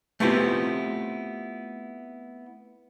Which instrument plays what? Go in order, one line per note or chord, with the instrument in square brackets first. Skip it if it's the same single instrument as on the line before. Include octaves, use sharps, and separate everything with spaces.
[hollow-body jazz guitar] A3 B3 C4 E4 F4 G4